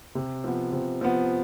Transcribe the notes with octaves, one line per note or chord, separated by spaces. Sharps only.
C3
F3 B3
C3
F3 B3